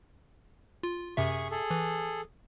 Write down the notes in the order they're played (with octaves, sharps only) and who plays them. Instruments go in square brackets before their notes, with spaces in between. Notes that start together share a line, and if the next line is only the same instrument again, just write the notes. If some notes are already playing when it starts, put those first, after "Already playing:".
[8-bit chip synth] F4
[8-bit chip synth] F#2 C3 E5 [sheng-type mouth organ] G#4 C#6
[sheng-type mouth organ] G#4 A4
[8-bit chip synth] E3